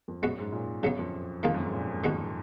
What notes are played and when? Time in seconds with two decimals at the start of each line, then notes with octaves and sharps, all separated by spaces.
0.08 F2
0.22 F#2 G#3 B3 F#4
0.38 G#2
0.52 A#2
0.83 F#2 C#3 F#3 B3
0.99 F2
1.43 F2 D#3 A#3 F4 G#4
1.54 F#2
1.64 G#2
1.74 A#2
1.89 G#2
2.04 D#3 G#3 B3 F#4